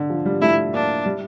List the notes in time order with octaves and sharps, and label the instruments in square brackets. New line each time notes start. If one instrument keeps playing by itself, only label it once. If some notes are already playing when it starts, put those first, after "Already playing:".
Already playing: [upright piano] D3
F3
G3
[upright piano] A3 [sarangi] E4
[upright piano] A#3 [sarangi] D4
[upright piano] G3